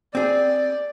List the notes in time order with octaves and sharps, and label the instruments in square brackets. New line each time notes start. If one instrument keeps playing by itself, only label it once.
[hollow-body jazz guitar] C4 G#4 [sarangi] D5